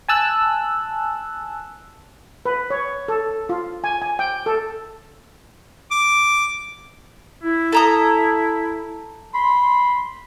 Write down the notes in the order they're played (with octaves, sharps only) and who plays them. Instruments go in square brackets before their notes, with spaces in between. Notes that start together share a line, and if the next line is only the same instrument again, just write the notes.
[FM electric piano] G#5 A5 E6 F#6
[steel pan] B4
C#5
A4
F4
G#5
G#5
G5
A4
[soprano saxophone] D6
[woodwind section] E4
[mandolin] A4 A#5 D#6
[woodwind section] B5 C6